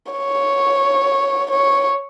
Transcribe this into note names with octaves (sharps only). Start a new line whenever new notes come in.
C#5
C#5